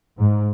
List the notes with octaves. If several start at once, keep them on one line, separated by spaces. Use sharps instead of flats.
G#2